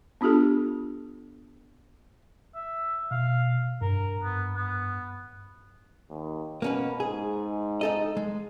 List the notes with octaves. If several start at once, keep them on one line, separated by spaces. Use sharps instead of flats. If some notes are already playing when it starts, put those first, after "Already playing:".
B3 D4 F4 G4 A4
E5
B2 F5
G2 A#4
B3
B3
D#2
B2 A#3 C#4 B4
G#2 G#4
D#4 A4 D#5
G#3